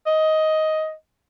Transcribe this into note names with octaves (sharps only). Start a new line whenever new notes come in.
D#5